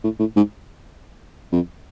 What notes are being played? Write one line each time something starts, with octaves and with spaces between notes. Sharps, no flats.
A2
A2
G#2
F2